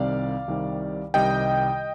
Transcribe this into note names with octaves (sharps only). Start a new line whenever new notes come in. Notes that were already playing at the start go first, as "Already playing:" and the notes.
Already playing: C2 C3 D#3 G3 D5 F5
C2 C3 D#3 G3
C2 C3 D#3 G3 D#5 G5